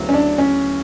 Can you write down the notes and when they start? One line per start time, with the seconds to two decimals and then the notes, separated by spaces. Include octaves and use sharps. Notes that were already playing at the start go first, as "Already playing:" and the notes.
Already playing: D2 C#3 F#3 B3 E4
0.09 C#4
0.14 D4
0.38 C#4